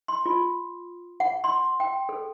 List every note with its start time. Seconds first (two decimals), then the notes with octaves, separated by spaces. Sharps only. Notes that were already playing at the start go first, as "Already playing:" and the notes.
0.08 C6
0.26 F4
1.20 F#5
1.44 C6
1.80 G5
2.09 A4